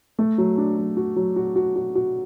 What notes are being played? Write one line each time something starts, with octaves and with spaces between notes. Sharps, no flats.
A3
F#3
D4
F#3
F#4
F#3
F#4
F#4
F#4
F#4